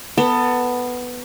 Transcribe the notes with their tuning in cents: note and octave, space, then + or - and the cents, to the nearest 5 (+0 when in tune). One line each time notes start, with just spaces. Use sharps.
B3 +0 A4 +25